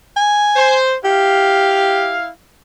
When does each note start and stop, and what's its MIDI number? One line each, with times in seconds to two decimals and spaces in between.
0.16 0.75 80
0.56 0.96 72
1.04 2.29 64
1.04 2.16 67
1.04 2.29 77